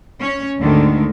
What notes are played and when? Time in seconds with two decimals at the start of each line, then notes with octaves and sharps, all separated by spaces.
0.19 C#4 C#5
0.59 D2 G#2 D3 D#3